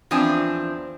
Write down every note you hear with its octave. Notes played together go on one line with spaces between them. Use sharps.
E2 F3 C4 D4 G#5